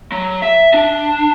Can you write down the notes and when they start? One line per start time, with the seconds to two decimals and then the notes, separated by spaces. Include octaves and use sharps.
0.12 F#3
0.42 E5
0.74 D4